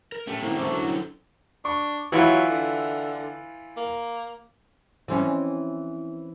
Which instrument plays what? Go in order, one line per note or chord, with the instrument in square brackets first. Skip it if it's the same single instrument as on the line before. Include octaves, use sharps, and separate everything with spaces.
[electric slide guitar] A#4
[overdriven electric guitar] A3 [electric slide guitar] C#4 G4 G5
[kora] A2 D3 A#3 [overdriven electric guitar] D#3 C4
[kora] A3 [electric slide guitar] C#4 D#4 A4 [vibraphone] C5 C#6 D6
[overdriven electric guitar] F#3 [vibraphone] D4 E4 [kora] A#4
[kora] C4
[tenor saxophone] D4 [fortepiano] C#6
[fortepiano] E3 E4 F4 [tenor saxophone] F#3
[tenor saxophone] D3
A#3
[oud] E3 C4 C#4